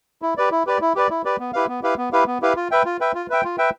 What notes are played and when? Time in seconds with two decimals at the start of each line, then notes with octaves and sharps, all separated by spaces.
0.22 E4
0.37 G4 B4 D5
0.52 E4
0.67 G4 B4 D5
0.81 E4
0.96 G4 B4 D5
1.10 E4
1.25 G4 B4 D5
1.39 B3
1.53 E4 G4 B4 F5
1.68 B3
1.83 E4 G4 B4 F5
1.97 B3
2.13 E4 G4 B4 F5
2.26 B3
2.42 E4 G4 B4 F5
2.56 F4
2.71 B4 E5 G5
2.85 F4
3.00 B4 E5 G5
3.15 F4
3.30 B4 E5 G5
3.44 F4
3.58 B4 E5 G5